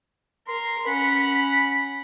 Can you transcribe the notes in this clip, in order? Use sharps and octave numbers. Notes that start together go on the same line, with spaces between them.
A#4 C6
C#4 F#5 B5